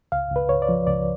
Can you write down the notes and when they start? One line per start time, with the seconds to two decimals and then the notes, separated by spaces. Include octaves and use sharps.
0.12 C#2 F5
0.30 C#2
0.36 B4
0.49 C#2 C#5
0.62 D5
0.69 F3
0.87 C#2 D5